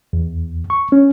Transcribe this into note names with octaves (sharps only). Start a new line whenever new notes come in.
E2
C#6
C#4